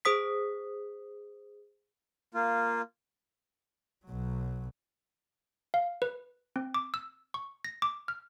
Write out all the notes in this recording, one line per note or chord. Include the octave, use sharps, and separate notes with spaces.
G#4 C5 D#6 B6
A#3 F4
B1 F#3
F5
B4
C4
D6
E6
C#6
A#6
D6
F6